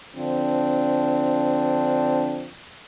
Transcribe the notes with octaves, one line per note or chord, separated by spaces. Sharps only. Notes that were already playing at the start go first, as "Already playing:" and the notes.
D3 F3 C4 D4